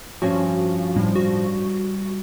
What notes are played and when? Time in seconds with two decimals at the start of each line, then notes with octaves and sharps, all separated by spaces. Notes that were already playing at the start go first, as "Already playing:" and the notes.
0.22 G2 F3 C#4 F#4 G#5
0.96 A2 G3
1.16 F#4